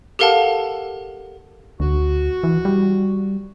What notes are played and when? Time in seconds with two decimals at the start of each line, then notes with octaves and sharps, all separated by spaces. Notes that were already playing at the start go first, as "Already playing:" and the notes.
0.19 G4 A4 A#4 F5 F#5 A5
1.80 D2 F#4
2.43 E3
2.65 G3